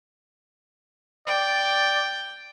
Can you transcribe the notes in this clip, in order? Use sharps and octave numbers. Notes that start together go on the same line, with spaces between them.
D5 G5